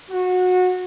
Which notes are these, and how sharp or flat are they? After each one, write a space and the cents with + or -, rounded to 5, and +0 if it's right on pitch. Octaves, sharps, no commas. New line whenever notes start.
F#4 -20